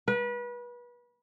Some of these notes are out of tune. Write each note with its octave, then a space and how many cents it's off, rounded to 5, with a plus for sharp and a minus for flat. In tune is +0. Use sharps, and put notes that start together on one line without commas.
B4 -30